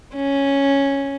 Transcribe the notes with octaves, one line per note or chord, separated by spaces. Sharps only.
C#4